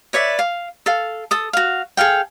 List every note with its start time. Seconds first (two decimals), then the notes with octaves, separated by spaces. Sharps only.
0.13 B4 C#5 D5 E5
0.39 F5
0.86 A4 F5
1.31 A4 D#6
1.53 F#4 F5
1.97 G#4 A4 F5 G5